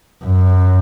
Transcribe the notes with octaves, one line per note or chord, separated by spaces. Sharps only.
F#2